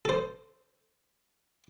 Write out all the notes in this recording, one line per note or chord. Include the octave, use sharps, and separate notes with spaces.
A4 C5